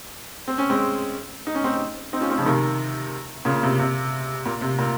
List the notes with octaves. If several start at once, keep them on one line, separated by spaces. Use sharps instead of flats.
C4
C#4
G#3 C4
D#4
C#4
C4 D#4
C4 D#4
C#4 F4
C4 D#4
C#3 F3
C3 D#3
A#2 C#3
C3
C3
A#2
C3
A#2